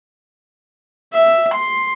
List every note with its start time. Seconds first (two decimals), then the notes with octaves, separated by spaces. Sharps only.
1.14 E5
1.55 C6